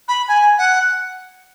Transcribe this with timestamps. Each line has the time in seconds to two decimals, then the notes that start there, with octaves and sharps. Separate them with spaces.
0.08 B5
0.28 G#5
0.58 F#5